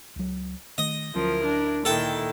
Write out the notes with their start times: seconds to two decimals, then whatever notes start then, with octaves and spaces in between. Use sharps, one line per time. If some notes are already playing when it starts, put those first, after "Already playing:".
0.16 C#2 F#3
0.78 D#3 A3 D#5
1.15 D2 F3 F#3 C#4 E4 A#4
1.46 D4
1.85 A#2 D#3 E4 A4 G5